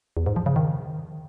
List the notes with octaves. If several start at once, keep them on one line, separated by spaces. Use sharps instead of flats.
E2
G#2
F3
C#3
D#3